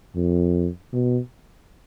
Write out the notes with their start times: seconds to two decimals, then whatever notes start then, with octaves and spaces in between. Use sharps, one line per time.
0.15 F2
0.93 B2